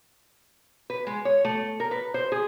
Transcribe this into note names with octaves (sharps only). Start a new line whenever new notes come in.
B4
G#3
C#5
A3
A#4
B4
C5
G#4